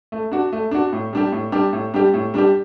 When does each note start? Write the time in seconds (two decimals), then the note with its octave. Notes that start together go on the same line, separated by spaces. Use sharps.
0.12 A3
0.32 D4 F#4
0.52 A3
0.71 D4 F#4
0.93 A2
1.13 G3 D4 G4
1.32 A2
1.52 G3 D4 G4
1.73 A2
1.94 G3 D4 G4
2.14 A2
2.34 G3 D4 G4